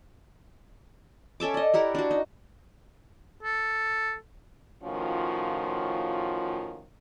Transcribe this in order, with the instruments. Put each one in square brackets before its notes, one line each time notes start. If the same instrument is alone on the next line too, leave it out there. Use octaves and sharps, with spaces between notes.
[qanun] C#4 A4 E5 D6
D5 D#5
E4 G4 A#4 F#5
D4 F#4
D#4
[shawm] A4
[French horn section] A2 D#3 F3 C#4 F4 F#4